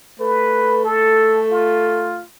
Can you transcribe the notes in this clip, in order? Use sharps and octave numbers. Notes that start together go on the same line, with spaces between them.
A3 B4
A4
F4